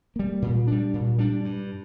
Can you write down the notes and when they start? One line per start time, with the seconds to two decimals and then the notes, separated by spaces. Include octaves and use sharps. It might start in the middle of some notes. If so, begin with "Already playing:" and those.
0.16 G3 A#3
0.42 A#2
0.67 G3 D4
0.94 A#2
1.18 G3 D4
1.44 G2